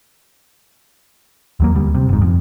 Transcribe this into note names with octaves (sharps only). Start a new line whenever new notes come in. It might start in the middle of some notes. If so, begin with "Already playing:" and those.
D#2 F#3 A#3
D2 G3
C3
F#1 G#2
F2